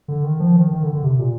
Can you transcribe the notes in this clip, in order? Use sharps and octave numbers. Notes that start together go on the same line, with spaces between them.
D3
D#3
F3
D#3
D#3
D3
D3
C3
A#2